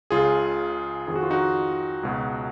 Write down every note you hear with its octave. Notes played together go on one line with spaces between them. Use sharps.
C#2 C#3 F4 G#4
F2 D#3 G#4
F#4
F4
D#4 F#4
C#2 B2